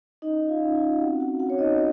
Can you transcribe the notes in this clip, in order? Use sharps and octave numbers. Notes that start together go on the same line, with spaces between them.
C#4 D#4 D#5
F4 F5
C#4
F4 F5
C4 F#4 F#5
F#4 F#5
F4 F#4 F#5
C#5
D#4 D#5